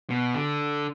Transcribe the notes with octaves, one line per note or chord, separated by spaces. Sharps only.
B2
D3